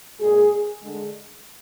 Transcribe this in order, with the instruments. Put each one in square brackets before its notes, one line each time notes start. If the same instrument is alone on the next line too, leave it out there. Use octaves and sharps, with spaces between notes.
[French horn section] A#2 G#3 G#4
D3 G#3